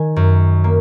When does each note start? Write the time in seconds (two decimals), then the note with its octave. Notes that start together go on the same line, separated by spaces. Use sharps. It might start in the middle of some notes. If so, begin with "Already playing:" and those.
Already playing: D#3 G#5
0.16 F#2
0.64 A#3